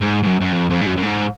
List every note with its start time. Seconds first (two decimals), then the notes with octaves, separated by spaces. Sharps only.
0.02 G#2
0.23 G#2
0.27 F#2
0.41 F#2
0.52 F2
0.70 F2
0.82 G#2
0.86 F#2
0.97 F#2
1.03 G#2